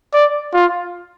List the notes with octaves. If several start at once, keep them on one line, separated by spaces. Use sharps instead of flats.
D5
F4